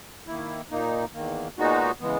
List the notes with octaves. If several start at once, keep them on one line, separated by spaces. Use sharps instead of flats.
D#3 A#3 E4
A#2 A#3 D#4
E2 D#3 A#3
A#2 G#3 B3 D#4 F#4
C#3 E3 G#3 B3